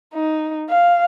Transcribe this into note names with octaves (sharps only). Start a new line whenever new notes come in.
D#4
F5